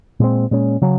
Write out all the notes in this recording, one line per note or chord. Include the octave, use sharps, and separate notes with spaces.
A#2 G#3 C4
A#2 G#3 C#4
C#3 F#3 C#4